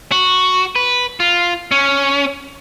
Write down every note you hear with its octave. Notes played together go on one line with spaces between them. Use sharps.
F#4
B4
F4
C#4